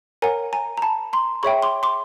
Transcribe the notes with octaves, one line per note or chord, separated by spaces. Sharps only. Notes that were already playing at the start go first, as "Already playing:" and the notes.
A#4 C#5 F#5 G#5 A#5
G#5 A#5
A#5
A5 B5
A#5 C6
G#4 C#5 E5 G5 B5 C#6
C6 D6
C6 D6